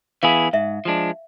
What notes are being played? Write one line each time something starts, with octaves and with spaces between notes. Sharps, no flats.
E3 B3 E4 G#4 F5
G#2 E5
F3 G#3 D4